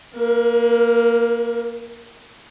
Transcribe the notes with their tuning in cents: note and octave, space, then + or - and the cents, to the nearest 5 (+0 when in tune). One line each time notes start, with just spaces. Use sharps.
A#3 -5 A#4 +40